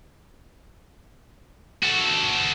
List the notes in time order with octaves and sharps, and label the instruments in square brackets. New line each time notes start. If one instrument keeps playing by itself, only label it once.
[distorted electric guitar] F#4 A4